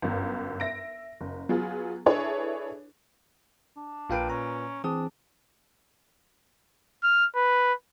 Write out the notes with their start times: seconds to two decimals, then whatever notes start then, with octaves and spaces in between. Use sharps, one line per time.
0.02 G1 F#2
0.60 E5 A#6 D7
1.21 F#1
1.49 F#3 B3 F4 G#4
2.06 D4 E4 G#4 A4 B4 C#5
3.77 D4
4.09 A#1 A#2 B4 F5 G5 D7
4.30 C#4 A#5
4.84 E3 C4 D4 G#4 D#6
7.03 F6
7.36 B4